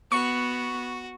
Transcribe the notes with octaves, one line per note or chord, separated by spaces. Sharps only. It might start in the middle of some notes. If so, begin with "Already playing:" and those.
B3 F#4 C#6